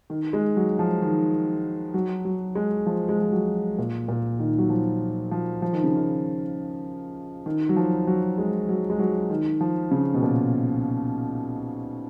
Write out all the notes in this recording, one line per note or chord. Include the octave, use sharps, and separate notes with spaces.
D#3
G#3
F#3
F3
D#3
F#3
F#3
G#3
F3
G#3
F3
F#3
A#2
A#2
D#3
F#3
F3
F3
F3
D#3
C#3
D#3
D#3
F#3
F3
F#3
G#3
F#3
G#3
F#3
D#3
F3
C#3
B2
A#2